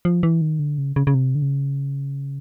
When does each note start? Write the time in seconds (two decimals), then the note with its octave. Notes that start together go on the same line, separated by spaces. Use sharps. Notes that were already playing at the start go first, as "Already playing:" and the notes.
0.05 F3
0.23 E3
0.41 D#3
0.59 D3
0.78 C#3
0.96 C#3
1.07 C#3
1.14 C3
1.35 D3
1.42 C#3